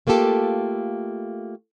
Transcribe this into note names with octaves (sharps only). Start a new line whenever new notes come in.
A3 A#3 F4 G4 A4